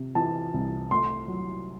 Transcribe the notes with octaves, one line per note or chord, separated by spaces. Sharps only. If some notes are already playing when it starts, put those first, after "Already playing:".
Already playing: C3
E3 A5
C2
A3 C6
F#3